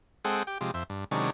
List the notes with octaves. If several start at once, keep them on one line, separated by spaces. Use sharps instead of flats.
G#3 C4 G#4 A4 F#5 G5
G4 G5
C3 F3 G#3 G4
F2 C5 E5
G2
C3 D#3 F#3 G#3 C#4 D4